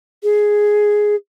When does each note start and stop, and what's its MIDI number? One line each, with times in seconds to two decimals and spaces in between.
0.23 1.15 68